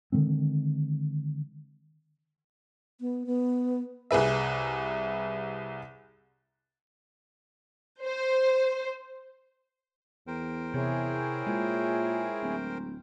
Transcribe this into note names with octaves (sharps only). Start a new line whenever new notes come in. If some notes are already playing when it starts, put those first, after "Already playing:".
D3 D#3 G#3 C4
B3
B3
C2 G#4 B4 E5
C5
E2 A#4 C5 G5
C3 E4 G#4 C#5
A#2 G#3
D1